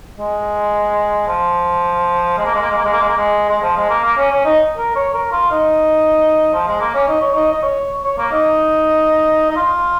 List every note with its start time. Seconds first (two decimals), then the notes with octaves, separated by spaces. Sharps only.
0.18 G#3
1.28 F3
2.38 G#3
2.45 A#3
2.54 G#3
2.61 A#3
2.70 G#3
2.78 A#3
2.85 G#3
2.93 A#3
3.01 G#3
3.09 A#3
3.16 G#3
3.49 G#3
3.62 F3
3.76 G#3
3.90 A#3
4.04 A#3
4.17 C#4
4.31 C#4
4.45 D#4
4.77 A#4
4.95 C#5
5.14 A#4
5.32 F4
5.51 D#4
6.53 F3
6.67 G#3
6.80 A#3
6.94 C#4
7.08 D#4
7.21 C#5
7.35 D#4
7.52 D#5
7.63 C#5
8.04 C#5
8.18 A#3
8.32 D#4
9.50 D#4
9.56 F4